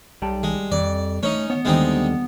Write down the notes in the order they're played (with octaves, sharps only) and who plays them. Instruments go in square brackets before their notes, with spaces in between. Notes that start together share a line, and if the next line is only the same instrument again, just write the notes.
[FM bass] B1 [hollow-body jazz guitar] G3 G5 A5
[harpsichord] G#3
[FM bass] F2 [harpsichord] D5
[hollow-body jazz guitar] A3 C#5 [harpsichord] C#4 D#4
[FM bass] B3 [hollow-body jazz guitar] C#5
[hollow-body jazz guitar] D#2 D3 G3 [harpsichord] G#3 C4 D#4